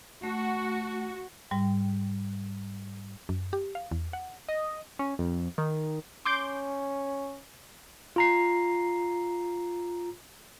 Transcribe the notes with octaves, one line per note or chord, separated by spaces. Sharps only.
A3 F#4
G#2 G3 G5
F#2
G4
F5
E2
F#5
D#5
C#4
F2
D#3
C#4 C6 D6 G6
F4 A#5 C7